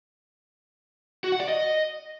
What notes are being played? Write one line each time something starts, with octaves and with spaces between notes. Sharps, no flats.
F#4
F#5
D5
D#5